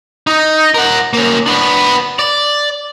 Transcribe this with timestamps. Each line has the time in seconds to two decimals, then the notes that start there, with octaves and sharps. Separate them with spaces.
0.27 D#4
0.74 A#4 F#5
1.13 A#3 C#4
1.46 B3 D4
2.19 D5